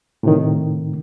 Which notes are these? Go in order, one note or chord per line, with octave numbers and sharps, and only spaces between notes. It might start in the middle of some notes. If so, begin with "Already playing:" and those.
A2 C3 D#3